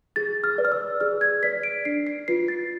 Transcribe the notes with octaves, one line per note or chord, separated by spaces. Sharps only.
G#4 A6
F6
B4 D5
F6
E6
G#4 F6
G#6
B4 D5 B6
D7
D4 C7
C7
F4 B4 C7
A6